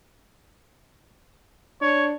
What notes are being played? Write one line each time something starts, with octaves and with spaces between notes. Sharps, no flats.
D4 C#5